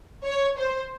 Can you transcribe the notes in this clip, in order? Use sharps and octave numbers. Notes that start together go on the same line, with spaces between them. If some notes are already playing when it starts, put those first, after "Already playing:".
C#5
C5